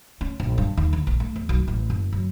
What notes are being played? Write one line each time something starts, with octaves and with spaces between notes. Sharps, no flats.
C#4
A#1
G2
D#2
D3
A#1
A3
E2
B1
A1
F#1
F#2